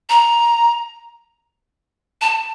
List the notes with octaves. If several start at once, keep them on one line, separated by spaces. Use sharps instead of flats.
A#5
A5